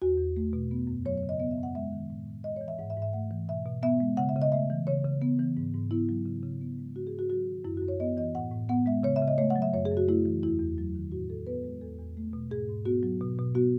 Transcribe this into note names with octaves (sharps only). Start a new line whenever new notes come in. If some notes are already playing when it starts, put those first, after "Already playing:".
E2 F#4
E2
A3
B2
B3
F#2
F#3 C#5
C#5
C#3
D#5
B3 D#5
E5
F#2
F#5
G#3 E5
D#3
A2
A2
G#3 D#5
E3 C#5
E5
G#2 F#5
E5
G#2
E5
A3 F#5
E3
B2 E5
B2
B3 E5
G#3
C#3 F#5
E5
C#3
D#5
A3 E5
E3
C#3 C#5
C#3
B3
E3
G#2
G#2
B3 E4
F#3
C#3
C#3
B3
G#3
G#2 F#4
G#4
G#2
F#4
F#3 F#4
D#3
F#2 E4
F#2 F#4
C#5
B3 D#5
E3 D#5
A2 F#5
A2
B3 F#5
G#3 E5
C#3 C#5
E5
C#3
D#5
A3 C#5
F#5
F#3
E5
F#2 C#5
G#4
F#2
F#4
A3 E4
E3
E2 E4
E2
F#3
D#3
A2 F#4
A2 A4
B3 B4
G#3
E2 A4
E2
A3
B2
G#2 G#4
G#2
B3 F#4
F#3
B2
B2
B3 F#4